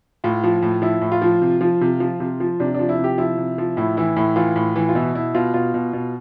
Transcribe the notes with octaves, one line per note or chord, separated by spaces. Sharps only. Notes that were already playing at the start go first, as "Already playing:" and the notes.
A2 F4
F3
A2
F3 E4
A2
F4
F3
C3
F3
C3
F3
C3
F3
C3 D4
F3 D4
E4
C3 G4
F3 E4
C3
F3
A2 E4
E3 E4
A2 E4
E3 F4
A2
E3
F4
B2 E4
B2 E4
B2 F4
B2 F4
B2
B2